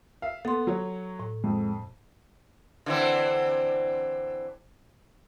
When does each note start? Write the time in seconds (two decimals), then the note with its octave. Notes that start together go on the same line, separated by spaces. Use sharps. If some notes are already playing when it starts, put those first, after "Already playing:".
0.22 E5 F5
0.45 B3 A4 C6
0.67 F#3 C#5
1.20 A2
1.44 F2 G#3
2.86 D3 E3 C4